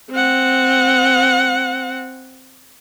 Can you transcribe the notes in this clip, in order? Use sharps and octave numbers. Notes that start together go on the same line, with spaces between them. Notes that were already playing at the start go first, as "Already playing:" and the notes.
C4 F#5